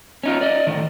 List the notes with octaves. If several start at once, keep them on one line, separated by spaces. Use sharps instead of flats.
C#4 D#4 F4
D5 D#5
A2 D#3